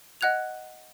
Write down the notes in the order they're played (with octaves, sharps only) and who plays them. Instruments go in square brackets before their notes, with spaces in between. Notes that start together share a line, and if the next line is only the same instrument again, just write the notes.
[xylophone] D#5 F#5 F#6 G#6 F7